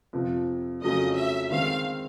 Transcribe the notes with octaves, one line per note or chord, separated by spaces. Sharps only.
F2 C3 F3
F2 C#3 F#3 A3 C#4 D#5
E5
D#3 G#3 C4 F5